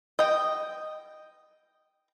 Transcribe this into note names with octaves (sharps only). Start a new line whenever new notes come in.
D#5 G5